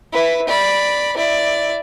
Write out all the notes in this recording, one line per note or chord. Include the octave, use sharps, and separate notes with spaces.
E4 B4
D5 B5
E4 D5